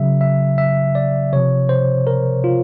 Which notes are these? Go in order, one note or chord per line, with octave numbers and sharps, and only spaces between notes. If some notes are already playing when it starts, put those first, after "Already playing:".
Already playing: C#3 F#3 E5
E5
E5
D5
C3 F3 C#5
C5
A#4
F4